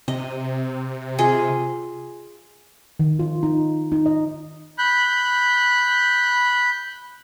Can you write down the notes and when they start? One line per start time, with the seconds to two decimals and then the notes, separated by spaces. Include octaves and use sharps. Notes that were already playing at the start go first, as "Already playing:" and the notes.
0.08 C3 D#5
1.18 F4 G#4 D#5
2.99 D#3
3.19 F4
3.43 D#4
3.92 D#4
4.06 D#5
4.78 B5 F#6 G6